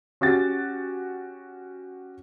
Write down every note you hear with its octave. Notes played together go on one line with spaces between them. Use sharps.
C#4 F#4 G4 A6